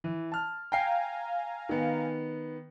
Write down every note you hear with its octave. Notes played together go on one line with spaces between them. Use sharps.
E3
A5 F6
F5 G5 G#5 A#5 C7
D#3 B3